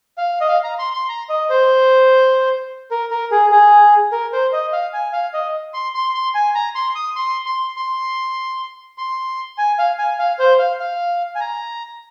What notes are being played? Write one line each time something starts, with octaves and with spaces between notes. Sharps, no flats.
F5
D#5
F5
A#5
C6
C6
A#5
D#5
C5
A#4
A#4
G#4
G#4
A#4
C5
D#5
F5
G#5
F5
D#5
C6
C6
C6
G#5
A#5
C6
D#6
C6
C6
C6
C6
G#5
F5
G#5
F5
C5
F5
F5
G#5
A#5